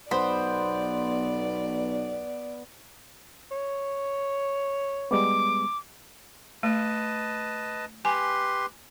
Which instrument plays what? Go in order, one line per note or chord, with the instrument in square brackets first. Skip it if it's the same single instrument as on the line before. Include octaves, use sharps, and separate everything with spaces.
[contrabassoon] B1 [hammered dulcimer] B3 [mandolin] C5 B5 [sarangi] D5
[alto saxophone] C#5
[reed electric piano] G3 G#3 B3 [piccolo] D6
[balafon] A3 [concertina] B4 D#5 A5
[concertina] G4 B4 C6 [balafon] G#5